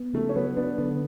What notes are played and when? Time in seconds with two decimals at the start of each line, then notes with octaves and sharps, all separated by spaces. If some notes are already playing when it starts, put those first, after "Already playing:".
Already playing: B3
0.13 C#3 A3
0.29 C#4
0.35 F#3 B3
0.57 B3 D4
0.78 D3 B3